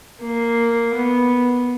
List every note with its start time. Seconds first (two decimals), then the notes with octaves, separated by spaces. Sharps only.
0.22 A#3
0.95 B3